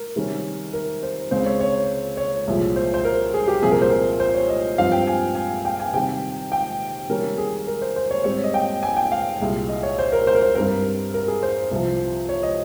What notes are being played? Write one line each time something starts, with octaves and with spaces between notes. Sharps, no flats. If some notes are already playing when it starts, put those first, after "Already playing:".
Already playing: A#4
C3 D#3 G3 C#4
A#4
C5
C#2 C#3 G#3 C4 C5
C#5
C#5
C#5
C2 A#2 F3 G#3
C5
C5
A#4
G#4
G4
C2 A#2 F3 C4 G#4
A#4
C5
A#4
C5
C#5
D#5
G2 F3 C4 F5
G5
G#5
G#5
G5
G#5
C3 D#3 G3 C4 G5
G5
C3 D#3 G3 A#3 C#4 A#4
G#4
A#4
C5
C5
C#5
G#2 G3 C4 C#5
C#5
D#5
G5
G#5
G5
F5
C2 A#2 G#3
D#5
C#5
C5
A#4
C5
A#4
C5
G2 G3 C4 A#4
A#4
G#4
C5
C2 C3 F3
C#5
D#5